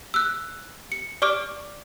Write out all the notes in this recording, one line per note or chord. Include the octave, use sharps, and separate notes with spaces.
E6 F#6
C#7
D5 C#6 D6 F6 D7